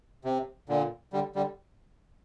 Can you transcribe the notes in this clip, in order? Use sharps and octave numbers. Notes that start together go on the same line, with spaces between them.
C3
A#2 D3
D3 G3
D3 G3